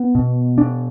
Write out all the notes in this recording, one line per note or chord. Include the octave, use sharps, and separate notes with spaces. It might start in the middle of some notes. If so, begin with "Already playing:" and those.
Already playing: B3
B2
D4